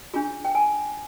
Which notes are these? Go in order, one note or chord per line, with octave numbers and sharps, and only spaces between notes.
D4 F4 G#4
G5
G#5